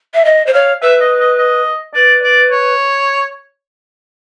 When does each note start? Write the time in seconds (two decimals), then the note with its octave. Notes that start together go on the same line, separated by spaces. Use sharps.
0.14 E5
0.25 D#5
0.46 C5
0.54 C#5 F5
0.82 B4 E5
1.00 D#5
1.19 D#5
1.38 D#5
1.94 B4 D5
2.23 D5
2.50 C#5